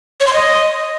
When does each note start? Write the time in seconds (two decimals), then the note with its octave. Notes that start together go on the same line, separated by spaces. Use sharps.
0.20 C#5
0.27 C6
0.33 D#5